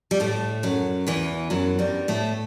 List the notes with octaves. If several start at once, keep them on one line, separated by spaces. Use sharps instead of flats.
G3
A2 A3
F#2 F#3
E2 E3
F#2 F#3
G2 G3
A2 A3